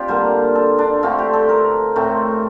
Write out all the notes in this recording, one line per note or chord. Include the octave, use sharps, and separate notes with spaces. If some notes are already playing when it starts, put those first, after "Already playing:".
Already playing: C4 D4 F4 G4
D3 G3 A#3 C5
A4
D4
D3 A3 C4 F4
G4
A4
A#4
A2 A3 C4